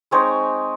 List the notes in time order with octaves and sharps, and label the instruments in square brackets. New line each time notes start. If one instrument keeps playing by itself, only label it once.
[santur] G#3 C4 D#4 C#5